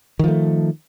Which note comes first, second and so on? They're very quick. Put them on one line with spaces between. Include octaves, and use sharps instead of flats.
D#3 F3 A3